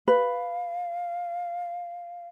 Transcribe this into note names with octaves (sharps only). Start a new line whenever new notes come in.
B4 F5